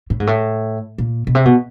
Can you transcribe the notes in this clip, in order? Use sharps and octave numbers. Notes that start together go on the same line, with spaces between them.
A2
G#2
A2
A#2
B2
C3
B2